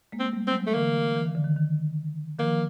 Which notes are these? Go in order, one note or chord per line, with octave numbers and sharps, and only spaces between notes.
G#3 A#3
C4
G#3
G3 A3
C4
F#3 G#3
A3
D3 E3 A#3
E3
D#3
D3
D#3
D#3
D#3 F3 A#3